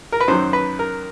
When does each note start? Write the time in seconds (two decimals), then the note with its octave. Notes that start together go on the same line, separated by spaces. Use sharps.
0.12 A#4
0.20 B4
0.28 F#2 D#3 F#3 C5
0.53 B4
0.79 A#4